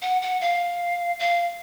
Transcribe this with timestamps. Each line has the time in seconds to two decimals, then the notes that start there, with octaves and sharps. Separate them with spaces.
0.02 F#5
0.22 F#5
0.41 F5
1.19 F5